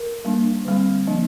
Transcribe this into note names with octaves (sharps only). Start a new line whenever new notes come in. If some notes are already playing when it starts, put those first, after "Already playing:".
Already playing: A#4
G3 A#3 D4
D3 G3 C4
F3 A#3 D4